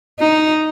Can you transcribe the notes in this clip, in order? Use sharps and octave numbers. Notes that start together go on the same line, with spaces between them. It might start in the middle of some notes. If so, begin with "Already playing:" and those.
D#4